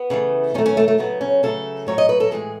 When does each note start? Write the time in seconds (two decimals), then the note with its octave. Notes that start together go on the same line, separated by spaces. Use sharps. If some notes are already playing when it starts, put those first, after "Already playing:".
Already playing: B3
0.10 C#3 E3 A3
0.54 D#3 F#3 A3 C#4
0.66 C#4
0.77 A3
0.88 A3
0.98 C#3 F#3 A3 B3
1.21 C#4
1.43 C#3 F#3 A3 A4
1.87 A2 F#3 A3 C#5
1.98 D#5
2.09 B4
2.20 A4
2.31 A2 E3 G#3 G#4